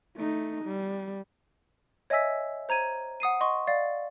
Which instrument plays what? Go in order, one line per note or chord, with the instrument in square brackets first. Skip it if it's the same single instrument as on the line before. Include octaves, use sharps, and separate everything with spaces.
[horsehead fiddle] A3 D#4
G3
[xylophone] C#5 D#5 E5 G#5 E6 B6
C5 A#5 G#6 D#7
F#5 D#6 C7 D#7
D#5 C6 C#6
D5 F5 A6